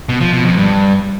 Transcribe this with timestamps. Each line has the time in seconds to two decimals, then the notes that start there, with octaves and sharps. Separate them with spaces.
0.09 B2
0.21 F3
0.33 B2
0.45 F2
0.57 G2